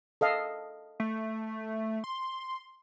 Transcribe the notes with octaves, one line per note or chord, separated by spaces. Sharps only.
A4 D#5 F5
A3
C6